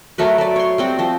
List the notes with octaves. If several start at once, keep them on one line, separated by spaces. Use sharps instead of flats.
F#3 A3 A#4 B4
A3 D5
C#5 C6
G3 C4 F#4
F3 C4